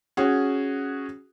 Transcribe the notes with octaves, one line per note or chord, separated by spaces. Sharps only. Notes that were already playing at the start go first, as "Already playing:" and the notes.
C#4 F#4 G#4